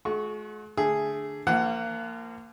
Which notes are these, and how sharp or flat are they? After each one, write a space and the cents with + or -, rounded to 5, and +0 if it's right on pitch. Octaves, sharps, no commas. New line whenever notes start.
G#3 +45 F#4 -25 C#6 -5
D3 +0 A3 +5 G#4 +0
F3 -35 A#3 -20 F#5 +15